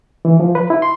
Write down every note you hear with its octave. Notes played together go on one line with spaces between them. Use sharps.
E3
F3
B4
E4
C6